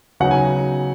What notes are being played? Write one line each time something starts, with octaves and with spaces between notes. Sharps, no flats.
C#3 F#3 B3 D#4 F#5
G#5